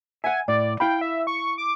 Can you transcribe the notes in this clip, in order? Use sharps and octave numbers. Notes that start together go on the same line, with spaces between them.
E5 F#5 G#5
A2 D5
E4 F5 G5 B5
E5
C#6
D6